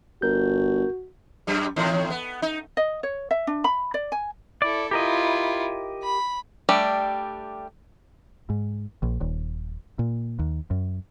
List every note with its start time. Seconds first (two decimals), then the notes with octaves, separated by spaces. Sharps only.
0.22 G1 F#4 A#4 G6
1.47 F#2 G3
1.76 E2 A2 D#3
2.10 B3
2.42 D#4
2.77 D#5
3.03 C#5
3.31 E5
3.47 D4
3.64 B5
3.94 D5
4.12 G#5
4.62 E4 A4 D5
4.91 E4 F4 G4 A#4 D#5
6.03 B5
6.69 G3 A3 D4 G4
8.50 G#2
9.03 A#1
9.21 D#1
9.99 A#2
10.39 D#2
10.71 F#2